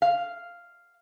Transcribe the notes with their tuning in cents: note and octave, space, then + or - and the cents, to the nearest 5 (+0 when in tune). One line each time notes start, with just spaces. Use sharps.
F5 -5